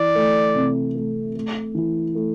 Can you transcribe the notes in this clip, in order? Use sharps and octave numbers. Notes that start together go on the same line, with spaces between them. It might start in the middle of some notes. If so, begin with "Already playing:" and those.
Already playing: E3 D5
A3
C3
A3
A3
E3
A3